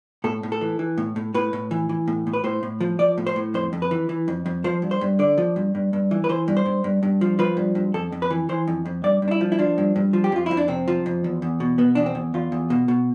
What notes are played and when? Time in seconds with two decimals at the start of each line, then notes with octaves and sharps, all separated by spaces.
0.24 A2 A4
0.43 A2
0.52 A4
0.61 E3
0.79 E3
0.98 A2
1.16 A2
1.34 A2 B4
1.53 A2
1.71 E3
1.89 E3
2.08 A2
2.27 A2
2.33 B4
2.44 A2 C5
2.63 A2
2.81 F3
2.99 F3 D5
3.18 A2
3.27 C5
3.36 A2
3.54 F2 C5
3.73 F2
3.82 B4
3.91 E3
4.09 E3
4.28 F2
4.46 F2
4.64 F3 C5
4.82 G2
4.91 C5
5.01 G2
5.19 D3 D5
5.38 F3
5.56 G2
5.75 G2
5.93 G2
6.11 E3
6.24 B4
6.29 E3 C5
6.48 G2
6.57 C5
6.66 G2
6.84 G2
7.03 G2
7.21 F3
7.39 F3 B4
7.57 G2
7.75 G2
7.94 F2 A4
8.12 F2
8.22 B4
8.30 E3
8.49 E3 C5
8.68 F2
8.86 F2
9.04 G2 D5
9.22 G2
9.28 D4
9.31 E4
9.41 F3
9.52 E4
9.59 F3 D4
9.78 G2
9.96 G2
10.13 F3
10.24 G4
10.32 F2 F4
10.46 F2 E4
10.57 D4
10.68 C3 C4
10.88 F3
11.06 F2
11.24 E2
11.42 E2
11.60 B2
11.78 B2 B3
11.95 E2 D4
12.06 C4
12.15 E2
12.34 E2 F4
12.52 E2
12.70 B2
12.88 B2